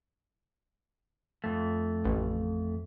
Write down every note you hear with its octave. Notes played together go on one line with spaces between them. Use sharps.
F2 A3
A1